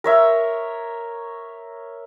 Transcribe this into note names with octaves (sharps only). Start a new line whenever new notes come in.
A#4 C#5 E5